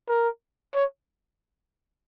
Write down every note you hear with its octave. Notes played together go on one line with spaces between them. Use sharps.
A#4
C#5